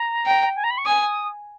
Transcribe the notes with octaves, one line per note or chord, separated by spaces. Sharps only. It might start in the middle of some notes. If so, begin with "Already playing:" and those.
Already playing: A#5
G5
G#5
A#5
B5
C#6
G#5 D#6